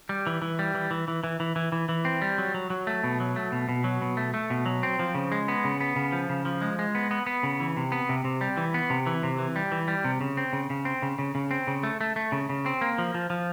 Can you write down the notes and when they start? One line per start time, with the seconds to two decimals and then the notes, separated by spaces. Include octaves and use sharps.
0.09 G3
0.27 E3
0.42 E3
0.59 G3
0.74 E3
0.91 E3
1.08 E3
1.24 E3
1.40 E3
1.56 E3
1.72 E3
1.89 E3
2.05 C4
2.22 G3
2.38 F#3
2.54 F#3
2.70 F#3
2.87 A3
3.04 B2
3.20 F#3
3.36 A3
3.52 B2
3.69 B2
3.84 F#3
4.02 B2
4.17 A3
4.34 A3
4.50 B2
4.66 F#3
4.83 C4
4.99 F3
5.15 C#3
5.32 G#3
5.48 B3
5.65 C#3
5.81 B3
5.96 C#3
6.12 F3
6.29 C#3
6.45 F3
6.62 G#3
6.79 G#3
6.95 B3
7.11 B3
7.27 B3
7.43 C#3
7.60 E3
7.77 C3
7.92 B3
8.09 C3
8.25 C3
8.41 G3
8.57 E3
8.74 B3
8.90 C3
9.06 E3
9.23 C3
9.38 E3
9.56 G3
9.72 E3
9.88 G3
10.04 C3
10.21 C#3
10.37 C4
10.53 C#3
10.70 C#3
10.85 C4
11.02 C#3
11.19 C#3
11.35 C#3
11.51 C4
11.67 C#3
11.83 A3
12.01 A3
12.16 A3
12.32 C#3
12.49 C#3
12.66 C4
12.81 A#3
12.98 F3
13.15 F3
13.30 F3